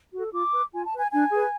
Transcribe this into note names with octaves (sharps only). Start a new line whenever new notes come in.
F#4 A4
F4 D6
B4
F4 G#5
A5
B4 G#5
D4 G#5
G#4 B4